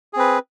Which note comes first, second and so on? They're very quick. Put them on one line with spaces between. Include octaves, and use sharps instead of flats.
G#4 C4 B4